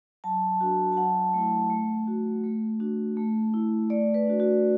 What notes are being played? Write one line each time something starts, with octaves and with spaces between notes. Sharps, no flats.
F#3 A5
D4 F#4
A5
F#3 F#5
A3 E4
A3
F#4
A3
D4 F#4
A3
E4
A3 D5
B4
D4 F#4
F#4